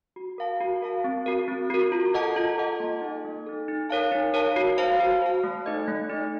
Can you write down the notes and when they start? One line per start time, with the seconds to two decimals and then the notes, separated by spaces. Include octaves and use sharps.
0.16 F#4
0.38 A#4 F5 A5
0.60 F#4
0.82 A#4 F5 A5
1.04 C4
1.26 F#4 A#4
1.48 C4
1.70 F#4 A#4
1.92 F4
2.14 A4 D#5 F#5 A5
2.36 F4
2.58 A4 D#5 F#5 A5
2.80 A#3
3.02 D#4 A4
3.24 A#3
3.46 D#4 A4
3.68 D#4
3.90 A#4 C#5 F5 A5
4.12 D#4
4.34 A#4 C#5 F5 A5
4.56 F#4
4.78 C5 F5 A5
5.00 F#4
5.22 C5 F5 A5
5.44 A3
5.66 D#4 A4 D#5
5.88 A3
6.09 D#4 A4 D#5